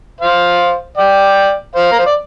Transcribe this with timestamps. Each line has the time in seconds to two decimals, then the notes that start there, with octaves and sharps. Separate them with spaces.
0.20 C5 F5
0.97 D5 G5
1.75 C5 F5
1.92 A#4
1.99 C5
2.06 D5